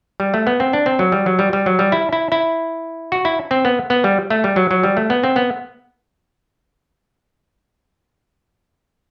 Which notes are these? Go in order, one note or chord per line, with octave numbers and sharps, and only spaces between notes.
G3
A3
B3
C4
D4
C4
F#3
G3
F#3
G3
G3
F#3
G3
E4
E4
E4
F#4
E4
C4
B3
B3
G3
A3
G3
F#3
F#3
G3
A3
B3
C4
B3